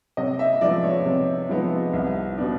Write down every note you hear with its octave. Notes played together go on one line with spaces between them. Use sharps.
C3 D#5
E5
F3 G#3 B3 D#4 D5
C#5
C3
F3 G#3 B3 D#4
C2
B2 G3 B3 D4